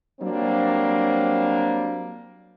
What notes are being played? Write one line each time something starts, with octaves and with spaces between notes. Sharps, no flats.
F#3 G3 A#3 C4 D4